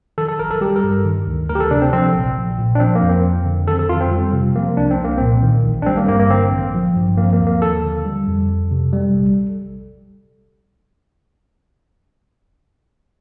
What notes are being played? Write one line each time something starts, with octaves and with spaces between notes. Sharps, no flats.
D#3 A4
A4
A1 A#4
A4
G3 G4
A#4
G2
D#3
D2
D2 A#4
G4
A4
C3 D4
C4
F3 C4
A#1
A#1
A#2
D4
F3 C4
A#3
F2
C4
F2
D3
D#3 A4
A4
F2 F4
C4
G3
C3
F3 A#3
C2 D4
C4
C2
A#3
A#2 C4
D#3
A1
D4
G3 C4
A#3
G2 A#3
A#3
D3 C4
A1
F3
G2
F3 A#3
A#3
D#2
A#3
D#2 A4
D3
G3
F2
F2
C3
G3
A#1